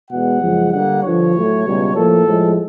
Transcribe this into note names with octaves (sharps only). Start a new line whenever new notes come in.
E2 B2 G#3 F#5
F#2 C#3 F3 G#3
G2 D3 G3 A#3 F#5
G2 D3 F3 C#5
A2 F#3 A3
C#2 B2 G3
A2 F3 A#3 A4
A2 F3 G#3